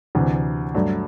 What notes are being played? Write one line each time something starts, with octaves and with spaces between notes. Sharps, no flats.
D2 C3 E3
G2 F#3 A3